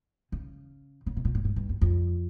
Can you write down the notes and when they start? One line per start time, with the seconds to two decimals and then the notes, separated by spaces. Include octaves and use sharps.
0.32 C#3
1.06 C#3
1.17 C3
1.25 A#2
1.35 A2
1.45 G#2
1.56 G2
1.69 F#2
1.81 F2